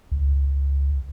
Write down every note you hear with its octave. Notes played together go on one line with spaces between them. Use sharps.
C#2